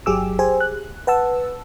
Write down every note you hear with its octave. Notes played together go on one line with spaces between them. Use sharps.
G1 F#3 G4 G#4 D6 E6
G4 G#4 C5 G#5
F#6
B4 F#5 A5 E6